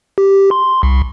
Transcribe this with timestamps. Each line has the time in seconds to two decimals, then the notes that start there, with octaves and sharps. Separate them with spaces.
0.18 G4
0.51 C6
0.83 C2